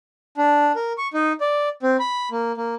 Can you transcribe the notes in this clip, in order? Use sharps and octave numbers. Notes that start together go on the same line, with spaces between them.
D4
A#4
C#6
D#4
D5
C4
B5
A#3
A#3